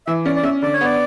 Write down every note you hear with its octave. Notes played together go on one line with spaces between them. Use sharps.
E3 E5
C#4 D5
D5
C#4 E5
D3 D5
C#5
B3 D5